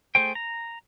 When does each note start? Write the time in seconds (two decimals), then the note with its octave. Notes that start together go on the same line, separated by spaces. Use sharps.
0.15 A3 G#4 C5 G5
0.35 A#5